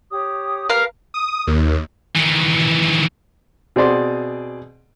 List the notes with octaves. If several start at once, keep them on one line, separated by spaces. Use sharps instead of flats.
G4 C#5 D#6
G4 A#4 B4 F5 F6
D#6
D#2
D#3 E3
B2 C4 G#4 D5 C6